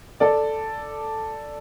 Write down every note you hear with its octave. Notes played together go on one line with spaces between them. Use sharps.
A4 D5